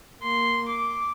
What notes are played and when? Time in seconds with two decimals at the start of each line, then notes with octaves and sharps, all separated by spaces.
0.22 A#3 C6
0.68 D6